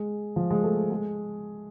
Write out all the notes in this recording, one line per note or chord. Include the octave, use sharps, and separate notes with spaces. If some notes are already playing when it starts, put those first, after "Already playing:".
Already playing: G#3
F3
G#3
A3
G#3